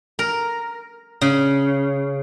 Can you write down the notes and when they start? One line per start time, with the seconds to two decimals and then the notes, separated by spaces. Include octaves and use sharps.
0.19 A#4
1.21 C#3